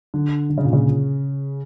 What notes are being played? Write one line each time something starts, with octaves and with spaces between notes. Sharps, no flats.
D3
D3
C#3
A#2
C#3